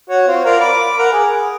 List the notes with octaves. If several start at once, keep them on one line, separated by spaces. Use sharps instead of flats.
F#4 C#5
C4 F4
F4 A#4 D5
B5 D6
A#4 F#5
G#4